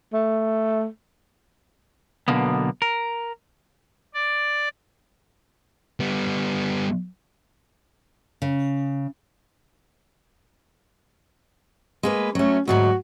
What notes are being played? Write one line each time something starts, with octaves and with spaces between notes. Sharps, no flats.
A3
B1 F#2 B2 D3 A#3 B3
A#4
D5
G3 B3
C#3
G#3 A#3 B4
F#3 A3 C#4
D2 G#2 F#3 F#4